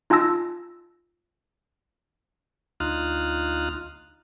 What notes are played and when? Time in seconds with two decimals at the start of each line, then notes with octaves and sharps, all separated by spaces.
0.10 D#4 F4 G#5 A5 E6 A#6
2.80 D2 D#4 F4 F6 F#6